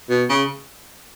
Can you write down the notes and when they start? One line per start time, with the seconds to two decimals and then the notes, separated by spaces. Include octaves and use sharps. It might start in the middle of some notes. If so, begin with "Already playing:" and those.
0.10 B2
0.30 C#3